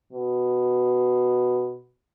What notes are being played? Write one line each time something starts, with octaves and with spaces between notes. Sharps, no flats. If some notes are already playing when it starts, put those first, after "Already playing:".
B2